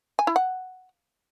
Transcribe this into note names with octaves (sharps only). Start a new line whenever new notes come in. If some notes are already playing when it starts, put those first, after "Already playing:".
G#5
E4
F#5